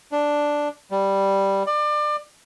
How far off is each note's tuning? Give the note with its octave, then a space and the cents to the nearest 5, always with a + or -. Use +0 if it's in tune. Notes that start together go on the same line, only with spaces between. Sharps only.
D4 +0
G3 +0
D5 +30